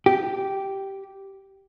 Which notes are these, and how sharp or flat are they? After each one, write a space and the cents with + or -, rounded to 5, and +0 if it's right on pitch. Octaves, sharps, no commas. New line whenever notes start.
G4 -10